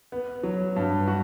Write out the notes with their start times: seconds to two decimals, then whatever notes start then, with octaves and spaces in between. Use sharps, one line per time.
0.12 B3
0.43 F#3
0.76 G2
1.07 F#4